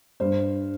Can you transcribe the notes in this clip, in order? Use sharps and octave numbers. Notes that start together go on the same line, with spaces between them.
G2 C5